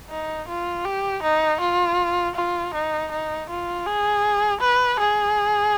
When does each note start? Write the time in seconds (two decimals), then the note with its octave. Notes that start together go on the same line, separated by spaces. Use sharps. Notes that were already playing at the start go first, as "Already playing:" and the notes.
0.10 D#4
0.48 F4
0.85 G4
1.23 D#4
1.60 F4
2.35 F4
2.74 D#4
3.11 D#4
3.49 F4
3.86 G#4
4.61 B4
4.99 G#4